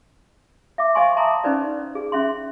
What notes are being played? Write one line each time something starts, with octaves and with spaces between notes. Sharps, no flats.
E5 D6
C5 D#5 F5 G#5 C6 C#6
E5 A5 A#5 C6 D6 D#6
C#4 D#4 B4 C5 D5
G#4
C#4 E5 C6